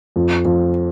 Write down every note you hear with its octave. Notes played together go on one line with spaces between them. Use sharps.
F2
F2